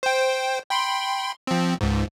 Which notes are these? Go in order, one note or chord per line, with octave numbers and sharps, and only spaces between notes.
C5 G5
G5 B5 C6
F3 C4
C#2 G#2